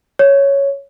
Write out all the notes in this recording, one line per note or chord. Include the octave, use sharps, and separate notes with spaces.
C#5